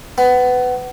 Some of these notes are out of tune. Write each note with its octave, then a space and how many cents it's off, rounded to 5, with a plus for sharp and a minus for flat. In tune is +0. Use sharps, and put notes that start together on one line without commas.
B3 +20